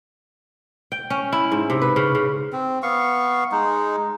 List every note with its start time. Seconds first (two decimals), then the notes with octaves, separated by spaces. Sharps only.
0.92 G5
1.10 C#4
1.32 E4
1.52 G#2
1.70 C3
1.82 B4
1.96 C#3
2.15 C#3
2.53 C4
2.83 B3 F5 C#6
3.52 G#3 D#4